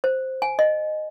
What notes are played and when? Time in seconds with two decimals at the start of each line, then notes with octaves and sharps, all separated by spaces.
0.04 C5
0.42 G#5
0.59 D#5